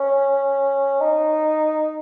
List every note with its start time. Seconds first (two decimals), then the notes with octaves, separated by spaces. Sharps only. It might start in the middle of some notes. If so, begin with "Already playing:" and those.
Already playing: C#4
1.01 D#4